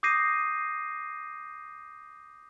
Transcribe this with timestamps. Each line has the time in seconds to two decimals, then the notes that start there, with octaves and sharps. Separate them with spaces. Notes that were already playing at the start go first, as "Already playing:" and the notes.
0.03 D6 D#6 G6 A#6 C7 D#7